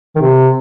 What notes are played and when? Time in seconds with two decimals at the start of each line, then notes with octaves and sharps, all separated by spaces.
0.16 D#3
0.21 C3